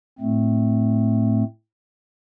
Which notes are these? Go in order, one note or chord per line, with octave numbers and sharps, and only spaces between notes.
A2 A3 C4